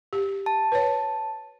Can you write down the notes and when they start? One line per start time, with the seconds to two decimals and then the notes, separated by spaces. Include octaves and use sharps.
0.13 G4
0.46 A5
0.72 B4 C#5